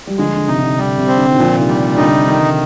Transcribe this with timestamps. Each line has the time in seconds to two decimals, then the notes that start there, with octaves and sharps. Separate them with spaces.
0.07 G3
0.18 D3 F3 G#3
0.36 D3
0.48 C3 D#4
0.58 C3
0.63 D3
0.78 D3 G3
0.98 C3
1.08 C4
1.17 D3
1.31 D#3
1.37 A#2 D3 F3
1.57 C3 D#3
1.68 G3
1.97 D3 D#4
2.12 C3
2.27 D3 D#3